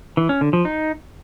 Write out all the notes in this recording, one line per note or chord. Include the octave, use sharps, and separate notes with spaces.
E3
C#4
D3
F3
D#4